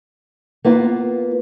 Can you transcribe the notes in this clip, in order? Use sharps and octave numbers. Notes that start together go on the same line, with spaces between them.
A#3 B3 F4